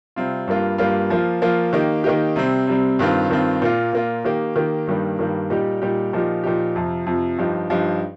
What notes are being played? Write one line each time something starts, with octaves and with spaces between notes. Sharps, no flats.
C3 G3 C4 F4
G2 G3 A#3 F4
G2 G3 A#3 F4
F3 A#3 F4
F3 A#3 F4
D#3 A#3 D#4 G4
D#3 A#3 D#4 G4
C3 G3 C4
C3 G3 C4
G2 D#3 C4 F4
G2 D#3 C4 F4
A#2 A#3 F4
A#2 A#3 F4
D#3 A#3 G4
D#3 A#3 G4
G2 D#3 G3 A#3
G2 D#3 G3 A#3
A#2 G3 D#4 G4
A#2 G3 D#4 G4
A#2 F3 D#4 G4
A#2 F3 D#4 G4
F2 C3 F3
F2 C3 F3
G2 F3 D#4 G4
G2 F3 D#4 G4